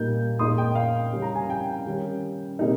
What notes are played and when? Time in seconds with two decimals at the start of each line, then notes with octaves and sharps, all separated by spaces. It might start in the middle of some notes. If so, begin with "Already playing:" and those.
Already playing: A#2 G3 A#3 D#4 G6
0.39 A#2 G#3 D#4 C6 D#6
0.58 G5
0.75 F5
1.13 C#3 G3 C#4
1.22 A#5
1.35 G#5
1.50 G5
1.86 D#3 G3 C#4
2.59 C3 G3 A#3 D#4